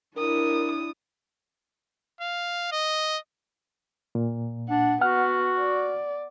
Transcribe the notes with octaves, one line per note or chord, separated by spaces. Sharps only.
D4 E4 A#4 D#6
F5
D#5
A#2
D4 F#5
B3 F#4 F#5 F6
D5